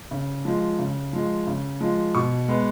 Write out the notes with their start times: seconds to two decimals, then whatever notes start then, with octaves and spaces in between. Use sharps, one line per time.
0.11 C#3
0.45 F3 G#3
0.79 C#3
1.13 F3 G#3
1.47 C#3
1.81 F3 G#3
2.15 B2 C#6
2.48 G#3 B3